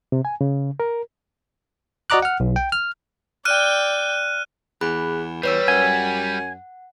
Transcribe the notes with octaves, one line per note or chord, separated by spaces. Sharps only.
C3
G#5
C#3
A#4
F#4 D5 D#5 A#5 D6 F#6
F#5 F6
B1
G5
F6
D5 G5 F6 F#6 D#7
E2 G#4 B5 F#6
E2 G3 B4 C#5 E6
F#2 F#5 G#5